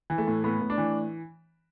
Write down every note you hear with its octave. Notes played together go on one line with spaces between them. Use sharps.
E3
A3
A2
A2 B3
A2
D4
E3